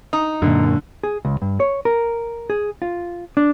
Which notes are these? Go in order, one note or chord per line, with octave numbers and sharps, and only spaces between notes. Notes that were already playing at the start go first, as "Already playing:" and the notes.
D#4
F#2 A#2 D3
G#4
C#2
G2
C#5
A#4
G#4
F4
D4